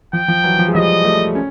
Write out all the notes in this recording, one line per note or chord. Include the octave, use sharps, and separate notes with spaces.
F3 G5
F3
E3 F#3
F3
G#3
F3 G3 D#5
G3 A3
C#4